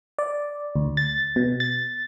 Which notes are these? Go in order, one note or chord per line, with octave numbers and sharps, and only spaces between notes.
D5
D2
A6
B2
A6